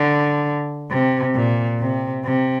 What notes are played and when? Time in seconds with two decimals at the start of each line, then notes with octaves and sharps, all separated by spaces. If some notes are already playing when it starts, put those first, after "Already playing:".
Already playing: D3
0.91 C3
1.35 A#2
1.80 C3
2.25 C3